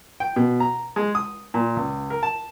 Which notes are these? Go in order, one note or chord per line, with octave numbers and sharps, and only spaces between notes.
G5
B2
A#5
G#3
D#6
A#2
C#2
A#4
A5